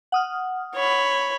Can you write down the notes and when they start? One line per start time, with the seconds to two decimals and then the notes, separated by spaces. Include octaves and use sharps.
0.12 F#5 D#6 F6
0.75 C#5 B5